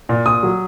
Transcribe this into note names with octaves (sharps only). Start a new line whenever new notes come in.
A#2
A#2 D#6
F#3